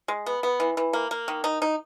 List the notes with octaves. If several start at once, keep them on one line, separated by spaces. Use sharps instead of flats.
G#3
B3
B3
E3
E3
A#3
A#3
D#3
D#4
D#4